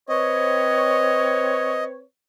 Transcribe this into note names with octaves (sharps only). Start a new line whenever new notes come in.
C4 B4 C#5 D#5